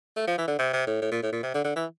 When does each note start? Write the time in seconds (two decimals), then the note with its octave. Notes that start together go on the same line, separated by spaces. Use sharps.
0.16 A3
0.27 F3
0.38 E3
0.47 D3
0.59 C3
0.73 C3
0.87 A2
1.02 A2
1.11 A#2
1.22 A2
1.32 A#2
1.43 C3
1.54 D3
1.64 D3
1.76 E3